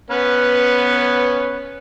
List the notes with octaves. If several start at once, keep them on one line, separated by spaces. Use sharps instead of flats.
B3 C#4 B4